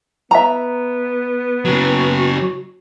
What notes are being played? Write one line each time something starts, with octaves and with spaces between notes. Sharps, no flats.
B3 E5 A#5
C#3 F#3 F#4